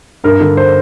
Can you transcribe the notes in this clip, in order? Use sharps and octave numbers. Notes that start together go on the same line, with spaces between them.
G2 A#4
D3
C5